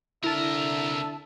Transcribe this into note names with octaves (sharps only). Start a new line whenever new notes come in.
C2 D3 E4 A#4 E5 A5